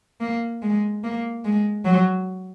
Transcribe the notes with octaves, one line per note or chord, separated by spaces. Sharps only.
A#3
G#3
A#3
G#3
F#3